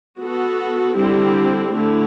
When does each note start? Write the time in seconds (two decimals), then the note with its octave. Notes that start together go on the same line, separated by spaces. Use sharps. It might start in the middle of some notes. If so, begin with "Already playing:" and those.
0.21 B3 F#4 A4
0.97 D3 G3 C4 E4 G4
1.74 D3 A3 E4